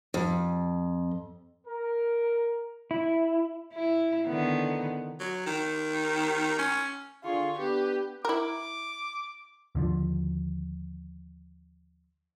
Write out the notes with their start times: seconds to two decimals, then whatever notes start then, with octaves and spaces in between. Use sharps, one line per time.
0.14 F2
1.66 A#4
2.91 E4
3.73 E4
4.27 D3 D#3 B3
5.20 F#3
5.46 D#3
6.59 C#4
7.24 D3 F4 G#4 C#6
7.59 B3 D4 G4 B4
8.25 E4 A#4 D6
9.75 D#2 D3 F3